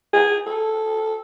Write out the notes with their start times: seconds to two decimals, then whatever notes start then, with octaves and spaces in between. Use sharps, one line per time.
0.14 G#4
0.47 A4